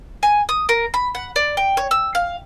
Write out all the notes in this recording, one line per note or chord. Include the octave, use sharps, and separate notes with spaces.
G#5
D#6
A#4
B5
F#5
D5
G5
C#5
E6
F5